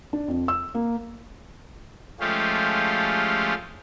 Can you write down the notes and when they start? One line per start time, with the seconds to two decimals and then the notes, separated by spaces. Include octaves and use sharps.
0.13 D4
0.28 F2
0.48 E6
0.75 A#3
2.20 F3 G#3 A3 C#4 F4 G4